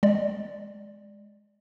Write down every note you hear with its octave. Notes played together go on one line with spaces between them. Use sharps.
G#3 D5